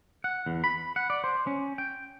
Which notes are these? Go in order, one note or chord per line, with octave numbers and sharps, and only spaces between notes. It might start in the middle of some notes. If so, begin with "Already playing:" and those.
F#5
E2
B5
F#5
D5
C5
C#4
G5